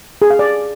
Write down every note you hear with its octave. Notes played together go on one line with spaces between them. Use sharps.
G#4
F5
D5